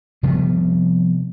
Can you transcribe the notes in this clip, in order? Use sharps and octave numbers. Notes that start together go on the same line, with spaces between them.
C3 F3 G3 B3